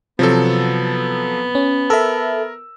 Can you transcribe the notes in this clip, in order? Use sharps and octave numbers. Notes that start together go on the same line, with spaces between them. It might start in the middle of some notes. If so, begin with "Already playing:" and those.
C3 F3 F#3 B3 A4
C#4
A4 A#4 E5 E6